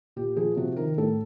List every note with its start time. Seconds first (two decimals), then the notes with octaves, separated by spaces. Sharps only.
0.16 A#2 G4
0.36 F3 G#4
0.57 C3 F#4
0.76 D#3 A#4
0.98 A2 A4